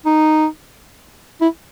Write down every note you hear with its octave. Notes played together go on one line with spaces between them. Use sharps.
D#4
E4